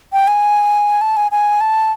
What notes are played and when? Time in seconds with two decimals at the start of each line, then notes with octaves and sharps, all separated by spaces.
0.13 G5
0.27 G#5
1.01 A5
1.17 G#5
1.32 G#5
1.61 A5